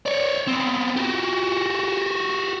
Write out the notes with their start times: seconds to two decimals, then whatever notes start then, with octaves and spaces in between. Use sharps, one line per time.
0.06 C#5 D5
0.48 B3 C4
0.97 F#4 G4